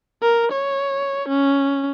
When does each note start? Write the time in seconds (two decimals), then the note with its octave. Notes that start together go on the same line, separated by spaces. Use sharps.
0.22 A#4
0.52 C#5
1.28 C#4